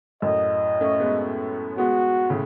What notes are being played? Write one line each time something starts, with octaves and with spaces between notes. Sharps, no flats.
F#2 A2 D#5
A3 C#4
G#3 B3
G#3 B3 F#4
A2 C#3